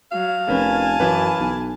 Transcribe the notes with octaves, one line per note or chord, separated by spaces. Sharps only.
F#3 F5
F1 C#4 A#4 B4 G#5 A5
F#2 E3 B4
B1